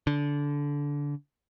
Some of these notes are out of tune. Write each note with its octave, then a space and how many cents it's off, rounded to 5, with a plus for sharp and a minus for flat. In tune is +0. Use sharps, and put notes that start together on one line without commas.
D3 -20